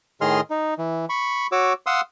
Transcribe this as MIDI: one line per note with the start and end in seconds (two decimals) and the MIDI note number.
0.21 0.41 45
0.21 0.41 51
0.21 0.41 68
0.21 0.41 75
0.21 0.41 84
0.21 0.41 89
0.50 0.74 63
0.79 1.05 52
1.09 1.47 83
1.09 1.47 85
1.52 1.73 66
1.52 1.73 73
1.52 1.73 86
1.52 1.73 88
1.86 2.01 77
1.86 2.01 78
1.86 2.01 84
1.86 2.01 87
1.86 2.01 88